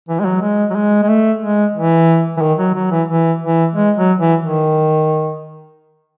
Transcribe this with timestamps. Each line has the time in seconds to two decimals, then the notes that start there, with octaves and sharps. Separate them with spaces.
0.09 E3
0.20 G#3
0.25 F#3
0.41 G#3
0.70 F#3
0.75 G#3
1.03 G#3
1.09 A3
1.42 G#3
1.75 E3
2.37 E3
2.41 D#3
2.59 F#3
2.75 F#3
2.91 E3
3.08 E3
3.42 E3
3.75 G#3
3.97 F#3
4.19 E3
4.42 D#3